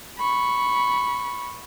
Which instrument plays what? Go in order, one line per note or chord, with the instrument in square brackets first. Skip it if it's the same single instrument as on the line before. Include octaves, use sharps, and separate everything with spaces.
[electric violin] B5 C#6